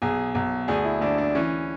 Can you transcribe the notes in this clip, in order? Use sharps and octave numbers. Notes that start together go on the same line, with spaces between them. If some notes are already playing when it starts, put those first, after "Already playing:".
B1 G#4
B1
D2 G#4
E4
D2 D4
D4
E3 C#4